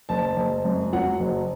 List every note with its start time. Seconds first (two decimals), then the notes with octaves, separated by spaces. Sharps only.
0.09 F#1 A5
0.37 F#1
0.65 F#2
0.93 F#3 F#5
1.20 F#1